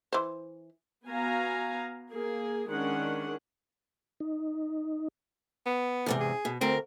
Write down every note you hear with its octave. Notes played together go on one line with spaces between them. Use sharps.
E3 C5
B3 F#4 F5 G#5 A#5
A#3 G#4
D#3 G#3 C#4 D4 F#5
D#4
B3
E2 G#2 C3
G#4
B2
D2 C4 A#4